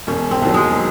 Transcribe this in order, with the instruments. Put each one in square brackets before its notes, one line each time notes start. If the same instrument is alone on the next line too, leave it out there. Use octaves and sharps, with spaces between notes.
[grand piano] E1 [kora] C#4
[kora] C4
[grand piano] D#2 D#3 F#3
[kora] G#3